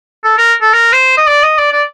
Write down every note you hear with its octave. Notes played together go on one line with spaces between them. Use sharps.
A4
A#4
A4
A#4
C5
D#5
D5
D#5
D5
D5